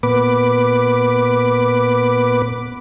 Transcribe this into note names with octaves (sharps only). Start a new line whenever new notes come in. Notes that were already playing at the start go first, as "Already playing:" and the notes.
A#2 B3 B4 D6